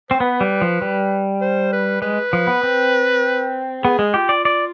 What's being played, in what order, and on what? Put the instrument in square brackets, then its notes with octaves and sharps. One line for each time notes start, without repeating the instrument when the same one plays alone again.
[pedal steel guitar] C4 [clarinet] C5
[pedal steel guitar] B3 [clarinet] B4
[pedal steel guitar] G3
F3
G3
[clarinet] C5
B4
[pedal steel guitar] G#3 [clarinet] B4
[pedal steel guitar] F3
B3
C4
[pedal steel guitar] B3 [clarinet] G#4
[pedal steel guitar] G#3
[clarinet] F4 [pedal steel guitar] G4
[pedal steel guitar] D5
D5